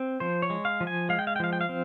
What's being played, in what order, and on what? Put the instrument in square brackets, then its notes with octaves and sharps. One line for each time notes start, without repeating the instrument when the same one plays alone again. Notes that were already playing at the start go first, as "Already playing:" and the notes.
Already playing: [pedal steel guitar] C4
F3 C5
C#5
G#3
F5
F3
G#5
G#3 F5
G5
F5
G5
F3 F5
G5
F5
C4